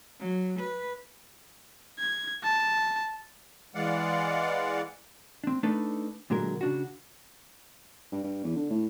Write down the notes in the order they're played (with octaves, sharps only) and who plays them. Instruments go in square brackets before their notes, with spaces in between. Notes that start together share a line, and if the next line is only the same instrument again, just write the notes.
[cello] F#3
B4
[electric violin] G#6
A5
[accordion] E3 G#3 D5 F5 F#5
[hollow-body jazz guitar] C4 D4
A3 D4 D#4 A4 B4 D5
A#2 D3 F#3 G#3 A#4
C#3 D4 F#4
[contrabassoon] G2
G2
E2
D3
A2